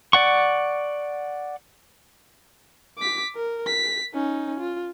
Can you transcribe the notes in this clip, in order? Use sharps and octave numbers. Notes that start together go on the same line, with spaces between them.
D5 F#5 C#6
D6 B6
A#4
B6
C#4 D#4
F4